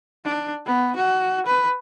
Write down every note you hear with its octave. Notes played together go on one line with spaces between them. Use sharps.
D4
B3
F#4
B4